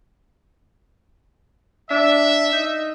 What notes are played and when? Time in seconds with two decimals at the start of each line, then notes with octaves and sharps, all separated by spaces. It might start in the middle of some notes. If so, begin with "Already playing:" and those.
1.90 D4 E5
2.53 D#4